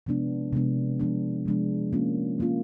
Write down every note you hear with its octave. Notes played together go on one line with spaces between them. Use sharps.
C3 F3 G#3 B3 D4
C3 F3 G#3 B3 D4
C3 F3 G#3 B3 D4
C3 F3 G#3 B3 D4
F3 A#3 C#4 F4
F3 A#3 C#4 F4